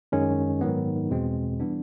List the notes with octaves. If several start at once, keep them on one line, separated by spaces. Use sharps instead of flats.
F#2 D#3 G#3 C#4
G#2 D#3 F#3 B3
E2 B2 G#3 C4
E3 G3 B3 D4